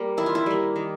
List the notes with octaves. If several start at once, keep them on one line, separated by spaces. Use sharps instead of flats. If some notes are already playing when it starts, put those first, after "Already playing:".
Already playing: G3 A#3
D#3 E4
F4
E4
G3 A#3
D#3